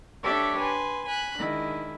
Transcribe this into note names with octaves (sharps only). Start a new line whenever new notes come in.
D4 G4 A4 C#5 D5 E5
B4 G#5 C6
G#5 B5 F#6
D#3 G#3 D4 E4